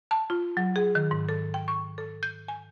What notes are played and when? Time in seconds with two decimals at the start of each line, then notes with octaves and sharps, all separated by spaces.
0.11 A5
0.30 F4
0.57 F#3
0.76 G#4
0.95 D#3
1.11 G#2
1.29 A4
1.54 G5
1.68 C#6
1.98 A4
2.23 G6
2.48 G#5